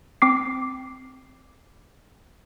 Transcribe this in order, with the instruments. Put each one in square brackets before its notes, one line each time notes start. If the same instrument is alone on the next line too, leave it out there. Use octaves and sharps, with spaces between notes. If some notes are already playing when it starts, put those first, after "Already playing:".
[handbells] C4 D6 C7